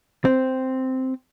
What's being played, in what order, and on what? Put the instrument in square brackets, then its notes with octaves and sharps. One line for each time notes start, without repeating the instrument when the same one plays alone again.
[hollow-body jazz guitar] C4